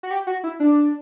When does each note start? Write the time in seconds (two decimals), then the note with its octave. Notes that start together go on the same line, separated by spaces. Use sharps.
0.03 F#4
0.11 G4
0.27 F#4
0.44 E4
0.60 D4